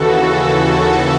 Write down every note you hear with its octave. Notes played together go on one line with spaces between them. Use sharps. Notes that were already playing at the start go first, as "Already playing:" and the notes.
Already playing: D#2 C#3 E3 F#4 A4